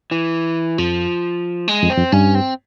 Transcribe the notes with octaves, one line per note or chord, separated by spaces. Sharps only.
E3
F2 F3
G#3
F2
C4
F2
G2 C#4
C4